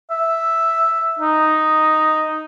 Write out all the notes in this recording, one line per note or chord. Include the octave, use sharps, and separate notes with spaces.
E5
D#4